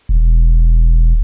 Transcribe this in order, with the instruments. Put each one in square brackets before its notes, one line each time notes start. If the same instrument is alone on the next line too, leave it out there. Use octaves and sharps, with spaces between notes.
[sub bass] E1